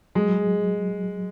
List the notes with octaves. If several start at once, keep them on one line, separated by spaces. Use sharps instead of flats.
F#3 G#3